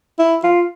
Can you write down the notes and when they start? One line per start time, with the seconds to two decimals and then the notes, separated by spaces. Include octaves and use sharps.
0.19 E4
0.43 F4